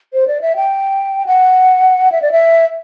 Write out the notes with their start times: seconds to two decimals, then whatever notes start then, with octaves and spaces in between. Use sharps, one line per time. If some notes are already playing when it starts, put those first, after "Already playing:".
0.13 C5
0.28 D5
0.41 E5
0.56 G5
1.27 F#5
2.12 E5
2.22 D5
2.32 E5